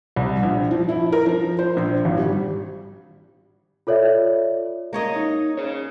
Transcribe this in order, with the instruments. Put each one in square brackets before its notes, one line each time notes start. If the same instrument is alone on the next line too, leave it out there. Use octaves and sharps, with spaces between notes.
[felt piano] C2
A#1
F3
E4
A#4
F3
C5
A#1
G#1
G3
[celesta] F4 A4 C#5 D5 E5
[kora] A#3 C#5 D#5
[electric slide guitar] D#4
G#4 C#5